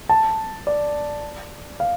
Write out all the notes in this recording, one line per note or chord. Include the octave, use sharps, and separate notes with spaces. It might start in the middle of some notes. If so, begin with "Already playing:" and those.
A5
D5
F5